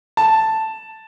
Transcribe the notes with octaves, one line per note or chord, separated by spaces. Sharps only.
A5